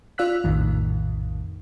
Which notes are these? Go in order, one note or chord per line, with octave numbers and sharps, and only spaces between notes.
F4 D5 F5 E6 F#6 B6
A#1 F2 A2 D#3